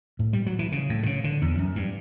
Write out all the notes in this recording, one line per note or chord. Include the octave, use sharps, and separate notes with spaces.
A2
G3
F#3
E3
C#3
A2
D3
C#3
D3
E2
F#2
G2